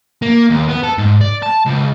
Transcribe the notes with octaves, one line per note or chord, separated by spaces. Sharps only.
A#3
D#2
B3
A4
G#2
D5
A5
C#2